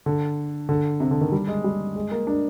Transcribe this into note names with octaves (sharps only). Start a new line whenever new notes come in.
D3
D3
C3
D3
D#3
G3
G#3
G3
G#3
A#3
D4